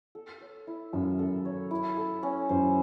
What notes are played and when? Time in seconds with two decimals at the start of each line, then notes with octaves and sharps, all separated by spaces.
0.15 A4
0.41 C#5
0.67 E4
0.93 F#2 E5
1.19 A4
1.45 C#5
1.71 E4
1.97 A4
2.23 C#4
2.49 F#2 C5